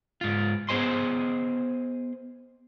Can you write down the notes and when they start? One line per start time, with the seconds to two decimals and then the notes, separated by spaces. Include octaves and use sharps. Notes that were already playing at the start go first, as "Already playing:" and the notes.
0.21 G#2 F4
0.69 B3 G#4 C5 D#5 G#5 C6